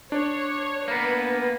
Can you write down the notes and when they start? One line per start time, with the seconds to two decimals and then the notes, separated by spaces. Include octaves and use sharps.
0.12 D4 C#5
0.88 A#3 B3 B4